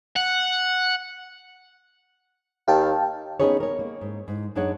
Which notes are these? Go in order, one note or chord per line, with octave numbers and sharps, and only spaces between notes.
F#5
D#2 F5 G5 A5
B3 C#4 D#4 G#4 B4 C#5
A#4 C#5
A#3
G#2
G#2
F#2 D4 D#4 G#4 C#5 F#5